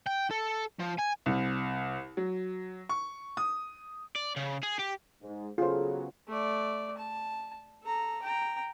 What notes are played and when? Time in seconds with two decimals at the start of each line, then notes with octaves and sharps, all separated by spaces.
0.06 G5
0.31 A4
0.79 F3
0.98 G#5
1.26 C2
2.17 F#3
2.89 C#6
3.37 D#6
4.15 D5
4.36 C#3
4.63 G#4
4.80 G4
5.22 G#2
5.58 C#3 F#3 B3 F4 G#4 A4 C5
6.28 A3 D5
6.98 A5
7.84 A4 A#5
8.23 G5 A#5